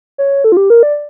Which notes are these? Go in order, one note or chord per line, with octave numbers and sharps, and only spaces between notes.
C#5
A4
F4
G4
A#4
D5